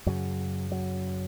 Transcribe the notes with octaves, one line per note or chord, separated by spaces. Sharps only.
F#2 C#3 F#3
F#3